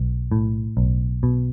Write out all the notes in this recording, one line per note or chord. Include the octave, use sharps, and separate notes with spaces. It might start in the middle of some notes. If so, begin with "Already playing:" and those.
Already playing: B1
A2
B1
B2